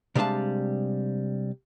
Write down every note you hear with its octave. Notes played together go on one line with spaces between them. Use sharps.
C3 G3 G#3 D4 F5 A5